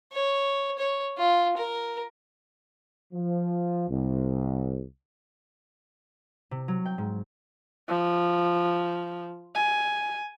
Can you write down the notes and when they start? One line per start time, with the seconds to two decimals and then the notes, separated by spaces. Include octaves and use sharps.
0.13 C#5
0.79 C#5
1.18 F4
1.57 A#4
3.14 F3
3.90 C2
6.51 C3
6.68 F#3
6.86 G5
6.98 G#2
7.89 F3
9.55 G#5